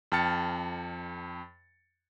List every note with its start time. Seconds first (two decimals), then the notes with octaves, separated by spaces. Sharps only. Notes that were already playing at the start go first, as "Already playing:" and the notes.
0.12 F2 G5 A5 F6 A6 C#7